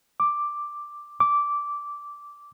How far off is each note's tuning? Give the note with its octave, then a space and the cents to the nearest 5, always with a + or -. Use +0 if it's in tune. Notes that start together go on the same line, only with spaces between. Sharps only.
D6 +5
D6 -10